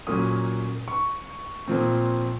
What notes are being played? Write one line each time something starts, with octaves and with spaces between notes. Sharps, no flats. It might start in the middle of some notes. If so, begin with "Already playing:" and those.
A#2 F#3 A#3 C#4 D#6
C#6
A#2 F3 C4